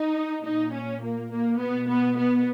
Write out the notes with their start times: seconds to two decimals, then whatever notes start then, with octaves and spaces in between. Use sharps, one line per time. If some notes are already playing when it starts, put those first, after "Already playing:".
Already playing: D#4
0.44 A#2 D#4
0.73 C#4
1.02 A#3
1.30 A#3
1.59 B2 B3
1.89 B3
2.17 B3